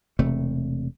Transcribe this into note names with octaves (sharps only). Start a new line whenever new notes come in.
E1 C3 A3